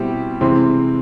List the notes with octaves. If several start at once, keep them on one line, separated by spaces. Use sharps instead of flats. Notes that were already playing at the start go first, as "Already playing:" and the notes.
Already playing: B2 G3 C4 E4 G4
C3 E3 G#3 C4